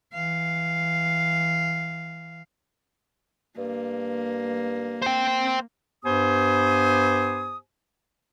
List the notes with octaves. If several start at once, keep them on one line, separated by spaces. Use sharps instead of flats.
E3 F5
G2 A#3
C5 G5
G2 B3 G4 C5 G#5 D#6